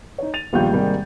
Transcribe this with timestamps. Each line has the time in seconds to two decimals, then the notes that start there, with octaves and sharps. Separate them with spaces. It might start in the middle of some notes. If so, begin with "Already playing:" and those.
0.18 D#4 C#5
0.34 A6 D#7 F7
0.53 A#1 D#2 G3 B3 F4 G6
0.72 G#2 C3 D#3 G3 G#3 A#3